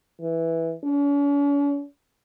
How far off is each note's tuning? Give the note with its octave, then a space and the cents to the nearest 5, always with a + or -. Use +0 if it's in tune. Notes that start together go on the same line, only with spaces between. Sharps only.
E3 -5
C#4 +45